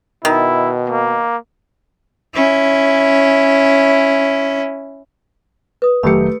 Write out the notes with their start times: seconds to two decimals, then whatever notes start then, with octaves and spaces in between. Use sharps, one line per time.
0.25 B2 D#3 E4
0.90 A#3
2.34 C#4 E4
5.82 B4 D#6
6.03 F1 D#3 F#3 A3 G4 B5 C#7